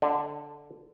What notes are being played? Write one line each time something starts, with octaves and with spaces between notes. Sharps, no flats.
D3